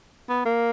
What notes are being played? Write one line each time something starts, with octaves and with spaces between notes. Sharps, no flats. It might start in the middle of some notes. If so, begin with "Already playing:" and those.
B3
A#3